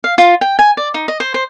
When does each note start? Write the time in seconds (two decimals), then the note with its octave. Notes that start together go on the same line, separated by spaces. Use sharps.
0.04 F5
0.18 F4
0.41 G5
0.59 G#5
0.77 D5
0.94 D#4
1.08 D#5
1.20 C5
1.34 C5